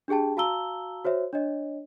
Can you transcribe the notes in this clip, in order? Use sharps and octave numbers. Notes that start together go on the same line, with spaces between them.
D4 G4 G#4 G5 A5
F#4 F5 A5 A#5 E6 G7
F#4 C5 C#5 E5
D4 C#5 D#5